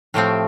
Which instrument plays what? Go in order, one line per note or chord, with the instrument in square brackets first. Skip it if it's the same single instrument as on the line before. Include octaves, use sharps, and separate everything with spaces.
[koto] A2 F3 C4 G4 [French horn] A3